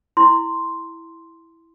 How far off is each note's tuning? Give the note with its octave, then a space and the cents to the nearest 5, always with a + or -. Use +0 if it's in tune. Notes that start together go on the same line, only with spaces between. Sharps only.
E4 +0 C6 +0